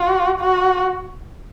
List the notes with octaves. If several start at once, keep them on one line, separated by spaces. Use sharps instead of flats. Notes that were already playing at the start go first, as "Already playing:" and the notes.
Already playing: F#4
F#4